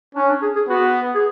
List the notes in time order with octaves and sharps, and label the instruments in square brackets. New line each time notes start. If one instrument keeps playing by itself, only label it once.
[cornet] C#4 [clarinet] D4
[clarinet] D4
G#4
G#4
[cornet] B3 [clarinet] F#4
[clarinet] G#4